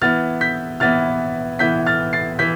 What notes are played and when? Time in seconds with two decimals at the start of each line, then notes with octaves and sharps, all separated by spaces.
0.02 E3 B3 E4 F6 A6
0.41 G6 B6
0.80 E3 B3 E4 F6 A6
1.59 E3 B3 E4 G6 B6
1.86 F6 A6
2.13 A6 C7
2.39 E3 G6 B6